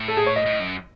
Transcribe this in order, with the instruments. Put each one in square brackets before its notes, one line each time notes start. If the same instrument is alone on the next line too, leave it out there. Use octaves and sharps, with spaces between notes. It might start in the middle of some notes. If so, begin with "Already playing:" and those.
Already playing: [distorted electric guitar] A2
[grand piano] A4
G#4
C#5
D#5
[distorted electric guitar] A2
F#2